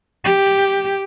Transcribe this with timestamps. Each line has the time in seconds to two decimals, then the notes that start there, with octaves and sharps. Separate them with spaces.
0.24 G4